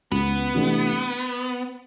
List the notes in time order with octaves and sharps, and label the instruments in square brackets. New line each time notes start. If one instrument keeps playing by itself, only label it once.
[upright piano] C#2 [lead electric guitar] B3
[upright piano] C3 E3 A3 D4